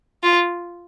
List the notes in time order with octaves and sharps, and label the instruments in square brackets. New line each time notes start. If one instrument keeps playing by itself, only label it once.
[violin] F4